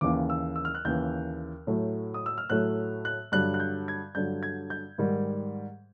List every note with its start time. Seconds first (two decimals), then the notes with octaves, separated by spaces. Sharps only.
0.01 D#2 C#3 E3 D6
0.30 E6
0.56 E6
0.65 F6
0.75 F#6
0.85 D#2 C#3 E3 G6
1.67 A2 F#3 A3
2.14 D#6
2.26 E6
2.38 F6
2.50 A2 F#3 A3 F#6
3.05 F#6
3.32 G2 D3 F#3 F#6
3.54 F#6
3.60 G6
3.88 G#6
4.15 G2 D3 F#3 G6
4.43 G#6
4.70 G6
4.98 G#2 D#3 G3